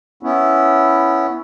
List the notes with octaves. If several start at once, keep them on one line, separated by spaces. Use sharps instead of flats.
B3 C#4 E4